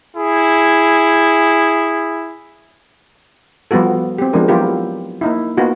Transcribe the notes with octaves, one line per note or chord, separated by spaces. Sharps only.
E4 G#4
F3 G3 B3 F4 F#4 A4
C4 G4
F3 G#3 B3 D4 A#4
F#3 B3 E4 F4 G4 A#4
A#3 D#4 E4
A#3 B3 D#4 F4 F#4